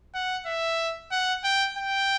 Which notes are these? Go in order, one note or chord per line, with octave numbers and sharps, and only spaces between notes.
F#5
E5
F#5
G5
G5